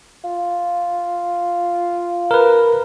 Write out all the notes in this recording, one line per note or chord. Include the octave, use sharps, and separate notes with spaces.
F4
A#4 B4